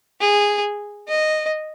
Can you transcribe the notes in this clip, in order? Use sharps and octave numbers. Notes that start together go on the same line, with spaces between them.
G#4
D#5